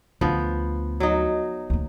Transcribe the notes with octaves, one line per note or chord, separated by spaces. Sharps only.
D2 F3 B3
F#3 D#4
D2 A#3